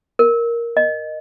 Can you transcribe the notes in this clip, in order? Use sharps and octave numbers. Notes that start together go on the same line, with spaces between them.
A#4
D#5